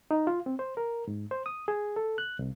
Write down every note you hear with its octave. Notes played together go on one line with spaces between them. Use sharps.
D#4
F4
C4
C5
A#4
G#2
C5
D#6
G#4
A4
F#6
C2